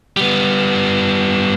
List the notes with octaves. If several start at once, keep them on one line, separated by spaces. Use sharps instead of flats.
G3 B3